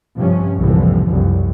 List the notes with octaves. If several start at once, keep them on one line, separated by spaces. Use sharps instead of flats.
G2 C3 F3 C#4
F#1 C2 A2 D3 E3 F3
C2 F#2